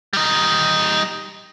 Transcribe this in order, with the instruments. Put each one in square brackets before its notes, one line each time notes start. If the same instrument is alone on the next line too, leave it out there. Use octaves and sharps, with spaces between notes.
[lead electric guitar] G3 D#4